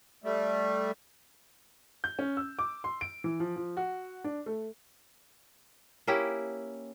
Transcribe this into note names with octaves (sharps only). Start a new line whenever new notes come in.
G3 A3
G6
C#4
E6
D6
C6
D7
E3
F3
F3
F#4
D4
A3
A#3 C#4 E4 G4